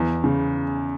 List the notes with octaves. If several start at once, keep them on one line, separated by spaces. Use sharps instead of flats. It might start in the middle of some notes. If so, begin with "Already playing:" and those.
Already playing: E2
C#3